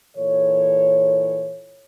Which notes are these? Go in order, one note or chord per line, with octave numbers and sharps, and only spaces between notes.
A#2 E3 A4 C#5